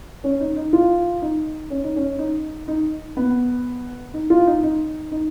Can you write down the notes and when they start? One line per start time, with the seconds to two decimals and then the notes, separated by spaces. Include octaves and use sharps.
0.24 C#4
0.40 D#4
0.56 D#4
0.73 F4
1.22 D#4
1.70 C#4
1.84 D#4
1.96 C#4
2.19 D#4
2.68 D#4
3.17 B3
4.14 D#4
4.30 F4
4.47 D#4
4.63 D#4
5.12 D#4